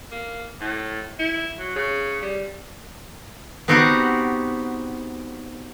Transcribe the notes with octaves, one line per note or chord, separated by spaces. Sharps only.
A#3
A2
E4
F#3
C#3
G3
B3 C4 D#4 F#4 G4 F#5